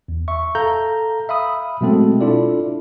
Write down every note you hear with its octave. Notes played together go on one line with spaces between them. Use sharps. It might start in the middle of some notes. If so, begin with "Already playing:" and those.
E2
E5 C#6
A4 F5 A#5 G6
E5 F5 B5 D#6
B2 F#3 G#3 A3 C4 A4
D4 E4 F4 A4 D5